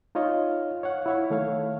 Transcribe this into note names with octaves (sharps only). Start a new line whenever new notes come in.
D#4 F4 C#5 D#5 F5
C#5 F5 F#5
E4 C#5 E5
D#3 A3 C#5 F5